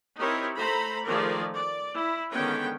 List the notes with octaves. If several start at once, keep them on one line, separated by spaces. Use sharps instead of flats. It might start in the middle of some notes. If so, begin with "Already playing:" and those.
C4 D#4 E4 G4 A#4 C#5
A3 A4 C5 A#5 B5
D#3 F3 A3 G#4 A#4 D5
D5
E4
D3 D#3 G#3 B3 C#4 G5